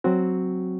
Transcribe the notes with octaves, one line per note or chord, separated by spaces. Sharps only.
F#3 C4 F#4